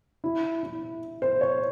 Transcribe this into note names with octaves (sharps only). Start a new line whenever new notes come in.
E4
E4
C5
C#5